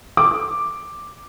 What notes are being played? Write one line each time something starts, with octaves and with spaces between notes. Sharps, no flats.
D6